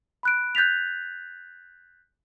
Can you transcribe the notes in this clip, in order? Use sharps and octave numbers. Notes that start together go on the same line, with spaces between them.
B5 F#6 D7
F#6 G6 A6 B6 F7